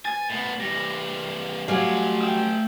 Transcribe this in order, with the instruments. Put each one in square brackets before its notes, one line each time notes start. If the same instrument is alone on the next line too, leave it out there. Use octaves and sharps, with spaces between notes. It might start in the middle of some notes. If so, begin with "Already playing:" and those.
[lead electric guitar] G#5 [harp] A6
[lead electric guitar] A2 B3
[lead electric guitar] E3 G3 [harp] A#6
[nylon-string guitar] F#3 G3 [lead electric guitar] A3 G#5 [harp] F5
[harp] G5 E6